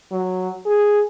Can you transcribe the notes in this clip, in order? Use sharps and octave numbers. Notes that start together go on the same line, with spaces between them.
F#3
G#4